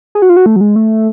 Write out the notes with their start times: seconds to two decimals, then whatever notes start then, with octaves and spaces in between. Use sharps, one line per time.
0.15 G#4
0.22 F#4
0.29 F4
0.37 F#4
0.46 A3
0.56 F#3
0.61 G#3
0.76 A3